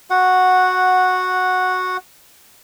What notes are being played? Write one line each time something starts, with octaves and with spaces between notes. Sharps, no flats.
F#4 F#5